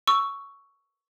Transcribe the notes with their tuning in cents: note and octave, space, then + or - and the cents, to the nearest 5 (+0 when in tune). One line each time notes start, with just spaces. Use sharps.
C#6 +5 E6 +0